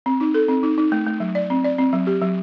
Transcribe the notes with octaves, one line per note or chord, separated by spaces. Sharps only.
C4
D#4
A4
C4
D#4
D#4
A3
A3
F#3
D5
C4
D5
C4
F#3
G4
F#3